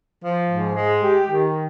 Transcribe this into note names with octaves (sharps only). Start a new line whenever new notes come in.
F3
G#2
G#3
G4
D#3